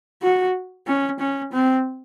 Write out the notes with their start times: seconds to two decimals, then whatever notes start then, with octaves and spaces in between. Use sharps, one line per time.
0.22 F#4
0.87 C#4
1.19 C#4
1.52 C4